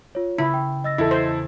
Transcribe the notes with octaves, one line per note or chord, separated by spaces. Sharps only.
F4 C#5
C#3 E4
G5
D#5 E6 A6 A#6
E2 E4 A4
C5